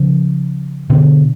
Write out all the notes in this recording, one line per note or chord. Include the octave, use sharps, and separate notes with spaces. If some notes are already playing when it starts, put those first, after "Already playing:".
Already playing: C#3 F3
B2 D3